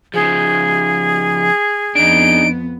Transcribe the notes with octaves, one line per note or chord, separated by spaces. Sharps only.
C#3 F3 G#4
F2 B3 D4 D#4 D7